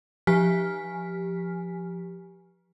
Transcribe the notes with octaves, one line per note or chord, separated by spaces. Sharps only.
F3 G4 G#5 F6 B6